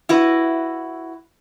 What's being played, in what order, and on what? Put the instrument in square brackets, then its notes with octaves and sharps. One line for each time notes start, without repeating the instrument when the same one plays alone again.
[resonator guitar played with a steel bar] E4 F#4 B4